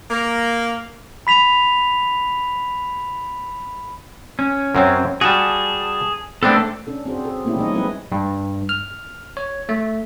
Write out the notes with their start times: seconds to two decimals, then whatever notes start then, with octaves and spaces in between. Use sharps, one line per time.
0.11 A#3
1.27 B5 B6 F7
4.39 C#4
4.75 F#2 F#3 C4
5.21 G3 F#4 G#4 A5
6.43 A3 B3 C4 D4 A4
6.87 C#4 D4 A4
7.05 C4 D4 F#4 G#4 C5
7.24 G#4 A4
7.45 A3 A#3 C#4 E4 G4
7.56 E3 G3 G#3 D#4 C#5 D#5
7.74 F#3 C4 E4 G#4 B4
8.12 G2
8.69 F6
9.37 C#5
9.69 A3